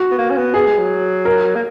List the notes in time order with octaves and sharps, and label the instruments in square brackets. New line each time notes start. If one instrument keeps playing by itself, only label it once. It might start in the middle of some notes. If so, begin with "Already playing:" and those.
Already playing: [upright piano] F#4
[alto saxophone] B3
A#3
C#4
B3
[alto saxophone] B3 [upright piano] G#4
[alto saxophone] G#3
F#3
[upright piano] A#4
[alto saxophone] A#3